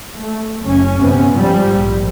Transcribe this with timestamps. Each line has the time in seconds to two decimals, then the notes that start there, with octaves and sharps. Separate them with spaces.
0.15 A3
0.61 F#1 C#4
0.99 G1 C3 B3 C#4
1.32 G#2 F3 G3
1.73 A#1